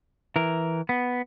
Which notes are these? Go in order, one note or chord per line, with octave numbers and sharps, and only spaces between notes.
E3 A#4
B3